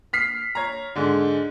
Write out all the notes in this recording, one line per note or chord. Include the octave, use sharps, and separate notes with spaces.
F6 B6 C7
C#5 A#5
G#2 D3